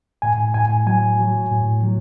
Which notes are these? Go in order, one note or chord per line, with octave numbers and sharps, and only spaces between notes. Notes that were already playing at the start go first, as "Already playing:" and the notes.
A2 G#5
A2 G#5
F#3 G#5
F#3
A2
F#3